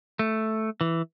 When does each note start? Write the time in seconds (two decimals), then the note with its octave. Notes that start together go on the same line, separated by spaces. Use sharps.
0.19 A3
0.81 E3